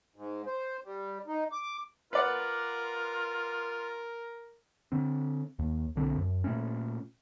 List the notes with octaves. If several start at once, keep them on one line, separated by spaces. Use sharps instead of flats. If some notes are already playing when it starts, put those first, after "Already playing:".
G#2
C5
G3
D#4
D6
F4 A#4 B4 D5 F#5
D3 C4
D#2
B1 D3 C4
F#2
A#2 A3 C#4